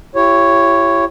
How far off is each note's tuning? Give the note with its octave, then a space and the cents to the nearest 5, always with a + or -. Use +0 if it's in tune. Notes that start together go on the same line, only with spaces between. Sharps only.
E4 +40 G4 -5 C#5 +0